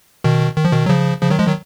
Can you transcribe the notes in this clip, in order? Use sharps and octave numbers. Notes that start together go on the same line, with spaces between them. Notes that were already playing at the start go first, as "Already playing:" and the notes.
B2 D#3
D#3
F3
B2 D#3
F#3
C#3 F3
C#3 F3
D#3 F#3
F3 G#3
D#3 F#3